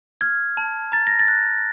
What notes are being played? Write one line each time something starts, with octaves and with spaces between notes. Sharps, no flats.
F6 G#6
A5
A#5 A6
A#6
A6
F#6